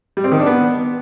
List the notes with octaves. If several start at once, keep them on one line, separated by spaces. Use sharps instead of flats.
G3
C4
D#3
D4
B3